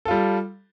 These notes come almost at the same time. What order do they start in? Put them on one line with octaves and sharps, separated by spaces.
A4 F4 G3